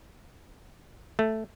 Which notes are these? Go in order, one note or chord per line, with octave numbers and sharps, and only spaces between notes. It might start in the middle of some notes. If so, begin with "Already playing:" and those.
A3